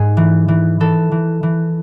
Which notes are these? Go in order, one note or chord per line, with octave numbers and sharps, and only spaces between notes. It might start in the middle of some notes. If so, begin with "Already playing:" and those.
Already playing: G#2 G#4
E3
E3
E3 A4
E3
E3